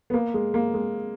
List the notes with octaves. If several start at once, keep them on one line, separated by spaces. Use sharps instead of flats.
B3
A#3
G#3
A#3
G#3